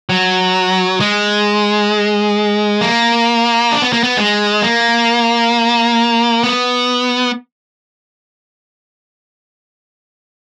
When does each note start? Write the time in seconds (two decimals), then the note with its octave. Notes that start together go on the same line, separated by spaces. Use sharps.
0.09 F#3
1.00 G#3
2.81 A#3
3.72 D4
3.82 B3
3.93 A#3
4.03 B3
4.17 G#3
4.62 A#3
6.44 B3